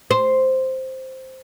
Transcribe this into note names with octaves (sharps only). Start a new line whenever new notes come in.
C5